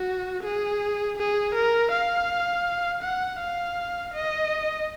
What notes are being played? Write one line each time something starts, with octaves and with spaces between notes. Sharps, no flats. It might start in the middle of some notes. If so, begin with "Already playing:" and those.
Already playing: F#4
G#4
G#4
A#4
F5
F#5
F5
D#5